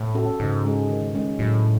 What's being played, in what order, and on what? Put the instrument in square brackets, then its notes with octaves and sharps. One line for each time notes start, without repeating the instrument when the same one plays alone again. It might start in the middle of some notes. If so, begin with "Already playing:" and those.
Already playing: [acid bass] A2
[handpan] C#4 F#4 A4
[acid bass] G#2 [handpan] C#3
[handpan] G#3 C#4 G#4
D#3
G#3 C#4
[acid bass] A2 [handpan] F#3